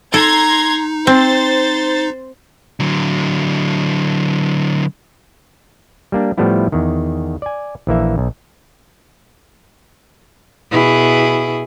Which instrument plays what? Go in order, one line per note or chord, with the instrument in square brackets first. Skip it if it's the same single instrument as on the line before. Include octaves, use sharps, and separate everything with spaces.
[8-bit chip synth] D#4 [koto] A4 [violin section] A#5 C6 G#6
[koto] C4 [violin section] C5 A6
[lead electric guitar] D3 F#3
[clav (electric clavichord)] G3 A#3 D4
A2 F3 G3 A3 B3 E4
E2 D#3
D5 G#5
A#1 E3 A#3 E5
B1
[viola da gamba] B2 E4 G#4